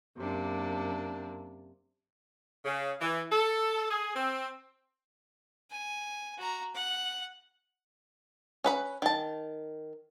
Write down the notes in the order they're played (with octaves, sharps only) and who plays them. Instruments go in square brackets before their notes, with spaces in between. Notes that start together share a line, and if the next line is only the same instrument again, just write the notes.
[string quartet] F#2 C3 A#3 D4
[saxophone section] C#3
E3
A4
G#4
C4
[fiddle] G#5
F#4 A#5
F#5
[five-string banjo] C#4 B4 B5
D#3 A5